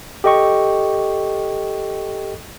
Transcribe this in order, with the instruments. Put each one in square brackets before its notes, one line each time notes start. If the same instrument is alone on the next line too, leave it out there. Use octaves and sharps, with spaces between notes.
[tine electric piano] G4 A4 D#5 G5 C#6